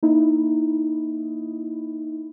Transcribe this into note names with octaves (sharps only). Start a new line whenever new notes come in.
A#3 D#4 E4